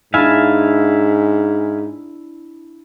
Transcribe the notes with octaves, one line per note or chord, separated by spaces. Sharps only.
G#2 D4 E4 E5 F5 G#5